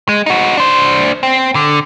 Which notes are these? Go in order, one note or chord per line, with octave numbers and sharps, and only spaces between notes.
G#3
D#4 F#4
D4 C5
C4
D3